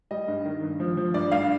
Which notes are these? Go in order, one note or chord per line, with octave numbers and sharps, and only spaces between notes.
G3 D#5
G2
D#3
G2
F3
F3
G2 D5
G2 F5